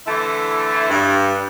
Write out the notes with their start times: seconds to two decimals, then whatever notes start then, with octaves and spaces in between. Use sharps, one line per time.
0.07 D3 E3 A3 E4
0.89 G2